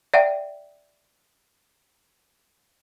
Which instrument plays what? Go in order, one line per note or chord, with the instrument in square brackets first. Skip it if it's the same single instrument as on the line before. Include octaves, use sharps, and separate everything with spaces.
[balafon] D5 E5 F#5 G5